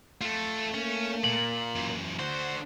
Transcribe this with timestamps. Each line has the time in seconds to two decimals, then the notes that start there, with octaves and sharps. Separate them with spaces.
0.21 A3 F4 A4
0.74 A#3 C#4
1.24 A#2 F#7
1.75 F#2 E3
2.19 D3 F#4 C5